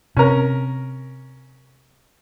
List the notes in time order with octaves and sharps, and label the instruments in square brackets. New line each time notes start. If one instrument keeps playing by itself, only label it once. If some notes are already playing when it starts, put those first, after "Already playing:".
[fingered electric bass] C3 [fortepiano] C#4 A#4